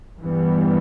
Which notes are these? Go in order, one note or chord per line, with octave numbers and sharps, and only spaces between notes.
G2 E3 G3 B3